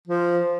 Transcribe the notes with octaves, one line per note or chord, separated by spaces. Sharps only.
F3